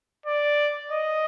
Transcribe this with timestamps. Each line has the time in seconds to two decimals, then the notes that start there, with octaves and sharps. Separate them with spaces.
0.26 D5
0.91 D#5